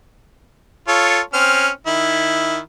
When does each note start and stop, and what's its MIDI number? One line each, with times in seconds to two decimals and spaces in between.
0.88 1.20 65
0.88 1.20 69
0.88 1.20 73
1.33 1.69 60
1.33 1.69 61
1.33 1.69 89
1.87 2.58 51
1.87 2.58 64